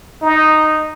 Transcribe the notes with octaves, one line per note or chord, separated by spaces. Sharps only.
D#4